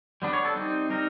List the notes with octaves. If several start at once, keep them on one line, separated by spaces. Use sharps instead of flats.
G3 B3 D4
C#5
A4
G3 C4 D#4
G3 C4 D#4 A#4